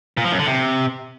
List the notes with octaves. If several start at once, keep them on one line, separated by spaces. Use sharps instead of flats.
A#2
F3
F#2
D3
C3